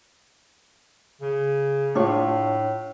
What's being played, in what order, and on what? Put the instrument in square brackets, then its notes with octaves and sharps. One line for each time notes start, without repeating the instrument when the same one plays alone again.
[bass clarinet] C#3
[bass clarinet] A2 [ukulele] D4 F4 C#5